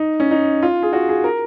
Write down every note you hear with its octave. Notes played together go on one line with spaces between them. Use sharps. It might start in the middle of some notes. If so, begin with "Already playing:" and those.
Already playing: D#4
C#4
D#4
F4
G#4
F#4
G#4
A#4